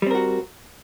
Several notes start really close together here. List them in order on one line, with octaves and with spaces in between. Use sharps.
G3 C4 A#4 F#4